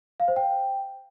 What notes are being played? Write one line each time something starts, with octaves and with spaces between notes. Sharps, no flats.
F5
C5
G5